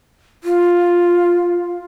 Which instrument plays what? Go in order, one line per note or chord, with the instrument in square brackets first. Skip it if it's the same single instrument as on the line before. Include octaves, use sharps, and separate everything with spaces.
[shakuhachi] F4